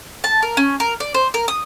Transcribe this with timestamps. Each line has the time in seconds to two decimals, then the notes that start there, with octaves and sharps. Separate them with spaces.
0.24 A5
0.43 A#4
0.57 C#4
0.80 A#4
1.00 D5
1.14 C5
1.34 A#4
1.48 D#6